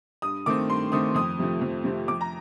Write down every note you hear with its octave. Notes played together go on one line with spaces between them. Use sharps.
G2 D#6
D#3 A3 C4 D6
G2 C6
D#3 A3 C4 D#6
F2 D#6
C3 F3 A3 C4
F2
C3 F3 A3 C4
F2 D6
A#5